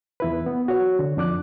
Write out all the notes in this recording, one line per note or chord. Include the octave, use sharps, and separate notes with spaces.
E2 E4 B4
B3
F#4 C#5
D3
F2 D4 D6 F#6